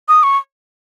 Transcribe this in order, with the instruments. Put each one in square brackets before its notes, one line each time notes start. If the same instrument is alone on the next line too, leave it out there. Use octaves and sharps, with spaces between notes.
[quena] D#6
C#6